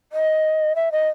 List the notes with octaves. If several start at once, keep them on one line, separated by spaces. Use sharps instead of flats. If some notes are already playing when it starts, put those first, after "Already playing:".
D#5
E5
D#5